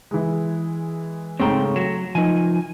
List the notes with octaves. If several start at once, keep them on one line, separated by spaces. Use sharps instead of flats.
E3 G#3
G#2 C#3 G#3 A3 C4 C#5 G5
F#3 E7
F3 D#4 G#5